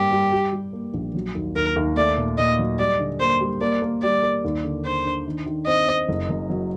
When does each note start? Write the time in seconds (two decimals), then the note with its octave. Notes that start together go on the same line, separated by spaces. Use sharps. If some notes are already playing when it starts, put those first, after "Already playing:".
Already playing: G2 G3 A#3 G4
0.11 G3
0.32 G3
0.53 G3
0.73 A#3
0.94 A#1
1.15 F#3
1.35 D#2
1.55 D#2 A#4
1.76 D#2
1.96 A3 D5
2.18 A#2
2.38 A#2 D#5
2.59 F#3
2.78 G3 D5
2.99 D3
3.20 A#3 C5
3.41 G3
3.61 A#3 D5
3.82 A#3
4.02 G3 D5
4.23 A#3
4.44 D#2
4.64 D3
4.85 D4 C5
5.05 D4
5.27 D#3
5.46 D#3
5.67 C4 D#5
5.88 C4
6.09 F#1
6.29 F#2
6.50 F#3